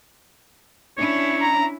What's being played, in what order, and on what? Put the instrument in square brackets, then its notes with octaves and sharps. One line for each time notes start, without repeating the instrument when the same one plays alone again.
[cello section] C#4 D4 E4 [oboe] C#5
[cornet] A#5